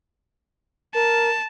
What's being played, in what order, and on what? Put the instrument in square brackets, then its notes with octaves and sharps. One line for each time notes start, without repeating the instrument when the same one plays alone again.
[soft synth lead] A#4 [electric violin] A5